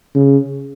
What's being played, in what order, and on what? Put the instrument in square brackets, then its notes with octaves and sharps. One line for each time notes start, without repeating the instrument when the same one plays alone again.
[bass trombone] C#3